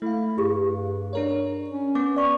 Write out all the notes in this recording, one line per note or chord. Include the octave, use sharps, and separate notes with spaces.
A3 E4 F5
G2 G4 G#4
D4 A#4 C#5
C#4
B3 D6
D5 C#6 D6